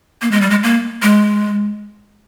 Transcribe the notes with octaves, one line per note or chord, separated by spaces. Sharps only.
A#3
G#3
G3
G#3
A#3
G#3